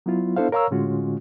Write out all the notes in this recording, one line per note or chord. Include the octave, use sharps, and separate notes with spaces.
F#3 B3 E4 F4
B3 D4 E4 A4 C5 F5
A#4 C#5 F5 A#5 C#6 E6
A2 D3 G#3 C#4 F4 F#4